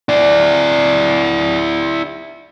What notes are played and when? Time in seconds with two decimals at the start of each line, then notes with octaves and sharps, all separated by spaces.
0.09 E4 D5